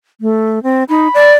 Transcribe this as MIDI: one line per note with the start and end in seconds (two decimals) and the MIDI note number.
0.21 0.62 57
0.63 0.84 60
0.89 1.08 63
0.89 1.31 83
1.14 1.34 74